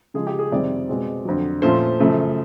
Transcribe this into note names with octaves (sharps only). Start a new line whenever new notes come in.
C#3 F3 G#3 G#4
G4
G#4
F2 C3 D#3 G3 C4 D5
B2 G#3 C4
F2 D3 F#3
A#2 F3 A3 C#4 C5
F#2 C#3 F3 A3